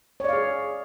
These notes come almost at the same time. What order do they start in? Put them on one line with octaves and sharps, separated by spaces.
C#5 D5 F5 G#4